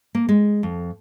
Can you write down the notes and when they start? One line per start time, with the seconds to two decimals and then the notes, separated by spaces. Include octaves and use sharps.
0.15 A#3
0.29 G#3
0.63 F2